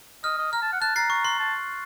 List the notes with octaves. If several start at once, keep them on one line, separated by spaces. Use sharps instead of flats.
D#5 F6
D#5
A#5 F6
A5
F#5
A5 F#6
A#5 A6 C7
C#6
C6
A5